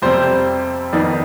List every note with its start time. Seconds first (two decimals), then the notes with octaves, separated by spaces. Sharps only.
0.02 F2 C3 G3 C4 C5
0.93 F2 D#3 B3 D#4 D5